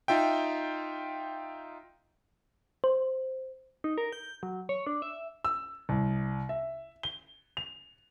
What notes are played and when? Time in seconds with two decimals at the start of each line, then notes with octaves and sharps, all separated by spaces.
0.08 D#4 F4 E5 G5
2.84 C5
3.84 D#4
3.98 A#4
4.12 G6
4.43 F#3
4.69 C#5
4.87 D4
5.02 E5
5.44 E6
5.89 C2
6.49 E5
7.03 G7
7.57 F7